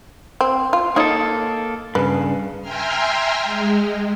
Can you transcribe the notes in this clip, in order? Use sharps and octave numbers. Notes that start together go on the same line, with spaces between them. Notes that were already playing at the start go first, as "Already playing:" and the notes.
C4
F4
A#3 D#4 A4 C#5 D#5
G2 C#3 B4
E5 G5 G#5 A#5 C6 F6
G#3